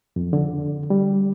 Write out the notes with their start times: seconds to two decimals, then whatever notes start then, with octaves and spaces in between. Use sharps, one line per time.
0.16 F2
0.33 D3
0.90 G3